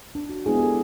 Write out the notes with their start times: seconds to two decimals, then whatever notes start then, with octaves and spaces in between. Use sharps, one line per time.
0.15 D4
0.29 F#4
0.46 G#3 B3 D4 E4 G#4
0.59 G4 A4